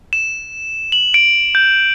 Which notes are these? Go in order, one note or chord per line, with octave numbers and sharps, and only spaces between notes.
E7
F#7
D7
G6